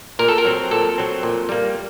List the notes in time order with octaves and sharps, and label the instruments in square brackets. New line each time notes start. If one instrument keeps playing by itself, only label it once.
[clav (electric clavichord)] A#2 A#4
A4
A#4
F#3 C4
A#2 A4
F#3 C4
A#2
G3 A#3